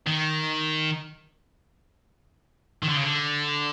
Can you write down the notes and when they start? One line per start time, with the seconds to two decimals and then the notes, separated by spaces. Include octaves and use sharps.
0.07 D#3
2.83 D#3
2.89 D3
2.96 C#3
3.04 D3